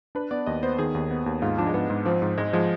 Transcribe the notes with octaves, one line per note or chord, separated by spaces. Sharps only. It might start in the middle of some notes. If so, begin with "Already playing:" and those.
D4 B4
B3 D5
D#2 D#5
B3 C5
D#3 G#4
D#2
B3
D#2
G#2 F4
F3 D4
G#3
G#2 B3
G#2
F3 C4
G#2
G#2 G#3
F3 G#3